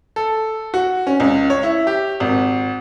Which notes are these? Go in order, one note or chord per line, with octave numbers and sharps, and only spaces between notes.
A4
F#4
C#4
C#2
C#5
E4
G4
G#1